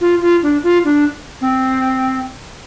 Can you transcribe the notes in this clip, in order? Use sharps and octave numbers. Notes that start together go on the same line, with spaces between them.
F4
F4
D4
F4
D4
C4